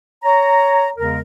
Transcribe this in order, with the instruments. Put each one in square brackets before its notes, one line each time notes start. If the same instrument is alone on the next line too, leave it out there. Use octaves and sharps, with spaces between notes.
[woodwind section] C#5 A#5
E2 C#3 G#3 A#4